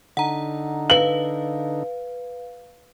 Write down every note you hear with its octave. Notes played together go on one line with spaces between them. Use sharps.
D3 D#4 F#5 A#5
B4 F5 F#7